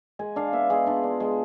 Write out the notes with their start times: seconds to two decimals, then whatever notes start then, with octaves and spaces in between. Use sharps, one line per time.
0.19 G#3 G#5
0.36 D4 F5
0.53 B3 E5
0.70 G#3 G#4
0.86 D4 F4
1.03 D4
1.20 G#3